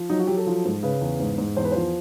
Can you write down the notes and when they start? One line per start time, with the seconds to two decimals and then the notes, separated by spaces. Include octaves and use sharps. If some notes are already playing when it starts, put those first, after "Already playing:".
Already playing: F3
0.10 F#3 D#4
0.19 F#4
0.27 F#3 G4
0.37 A4
0.46 F3
0.65 G#2
0.83 C#3 B4
1.01 E2
1.20 G#2
1.38 G#2
1.57 E2 C5
1.65 B4
1.72 F3 C5